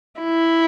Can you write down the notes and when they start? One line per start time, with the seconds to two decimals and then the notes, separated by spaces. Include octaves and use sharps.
0.21 E4